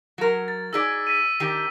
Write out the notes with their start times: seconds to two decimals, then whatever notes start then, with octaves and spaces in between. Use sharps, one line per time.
0.18 F#3 A#4
0.48 A6
0.73 D#4 G#4 D5 E6 B6
1.07 B6 D#7
1.40 D#3 D4 G4